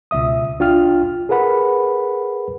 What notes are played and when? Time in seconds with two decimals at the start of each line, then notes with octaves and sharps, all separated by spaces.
0.11 C#2 B2 E5 D#6
0.59 C2 D4 F4 G5 F6
1.29 G#4 A#4 B4 F#5 B5